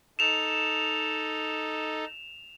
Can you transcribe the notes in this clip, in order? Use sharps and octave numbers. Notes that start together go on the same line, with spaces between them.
D#4 A4 E7 F7